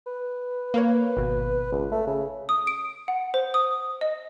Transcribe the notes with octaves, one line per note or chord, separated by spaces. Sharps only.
B4
A#3 A#4 C#5
G#1 B2
C#2
A3
C#3
D#6
D7
F#5
C5
D#6
D#5